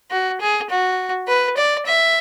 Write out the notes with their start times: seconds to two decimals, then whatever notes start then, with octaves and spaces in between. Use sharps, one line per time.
0.11 F#4
0.40 G#4
0.70 F#4
1.28 B4
1.57 D5
1.86 E5